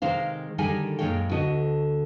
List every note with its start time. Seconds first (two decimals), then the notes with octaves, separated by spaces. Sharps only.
0.02 C3 D#3 G#3 C5 F5
0.58 D3 D#3 G3 G#4 G#5
0.99 F#2 A#2 G#3 G#4 C#5 G5
1.31 D2 D3 F#4 D#5